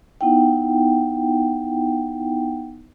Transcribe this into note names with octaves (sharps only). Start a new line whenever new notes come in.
B3 D#4 E4 F#5 G5